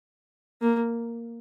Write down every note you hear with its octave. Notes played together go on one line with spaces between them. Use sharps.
A#3